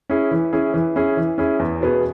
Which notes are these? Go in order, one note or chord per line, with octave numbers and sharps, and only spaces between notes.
C#4 E4 G#4
E3
C#4 E4 G#4
E3
C#4 E4 G#4
E3
C#4 E4 G#4
E2
B2 B3 G#4